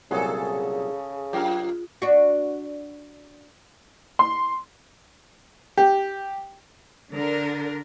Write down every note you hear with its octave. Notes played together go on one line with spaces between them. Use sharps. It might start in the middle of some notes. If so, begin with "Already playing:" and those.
C2 A#2 C#3 F#3 G#4 A4
F#2 F4 G4 A#4 F5
D4 F#4
C6
G4
D3 D4 A#4